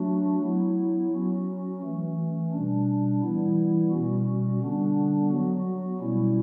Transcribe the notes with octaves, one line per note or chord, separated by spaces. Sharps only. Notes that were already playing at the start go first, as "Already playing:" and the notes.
Already playing: F#3 A3 D4 F#4
F#3 B3 E4
F#3 C#4 F#4
E3 A3 C#4
B2 G3 D4
E3 G3 B3 E4
B2 G3 C#4 F#4
D3 G3 B3 D4
F#3 B3 F#4
B2 G3 C#4 E4